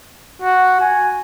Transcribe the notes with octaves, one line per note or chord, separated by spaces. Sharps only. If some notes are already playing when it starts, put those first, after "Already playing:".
F#4
G#5